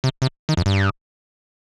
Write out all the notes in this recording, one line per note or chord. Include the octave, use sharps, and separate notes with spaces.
C3
C3
D#3
F2
G2